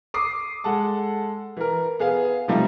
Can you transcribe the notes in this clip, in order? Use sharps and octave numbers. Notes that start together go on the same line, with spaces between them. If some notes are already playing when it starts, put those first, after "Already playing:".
D6 D#6 C7
G#3 A4 F#5 A5
E3 A#4
B3 G#4 F5
C3 F3 G3 A3 D#4 E4